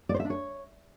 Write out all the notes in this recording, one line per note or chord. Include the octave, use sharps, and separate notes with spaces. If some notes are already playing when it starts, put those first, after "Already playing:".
D5
C5
E5
D4
C#5